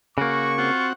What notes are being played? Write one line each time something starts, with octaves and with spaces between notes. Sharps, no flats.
C#3 A#3 F#4 C#6
C4 F4 F#4 F#5